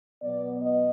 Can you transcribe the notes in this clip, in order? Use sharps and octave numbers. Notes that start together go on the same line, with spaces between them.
B2 F#3 B3 D5
D#5